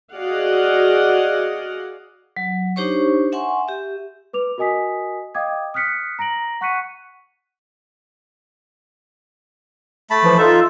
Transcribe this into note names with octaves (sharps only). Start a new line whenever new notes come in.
F#4 G#4 D5 D#5 F5 F#5
F#3
D4 D#4 G4 C5 C#5 C#6
E5 F#5 G#5 C6 C#6
G4 E5
B4 D6 F7
F#4 A#4 D#5 G#5 D#6 B6
D#5 F5 G5 D6 D#6 G#6
D#6 F6 F#6 B6 C#7
A#5 A#6 D7 F#7
F#5 C#6 F#6 B6 C#7 D#7
A3 A5 B5
E3 F3
D#4 F4 A4 E5